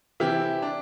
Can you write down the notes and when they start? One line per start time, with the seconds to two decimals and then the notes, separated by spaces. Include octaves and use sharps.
0.20 C3 E3 E4 G4
0.62 D4